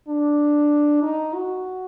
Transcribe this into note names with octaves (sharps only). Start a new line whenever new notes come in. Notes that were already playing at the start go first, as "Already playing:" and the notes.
D4
D#4
F#4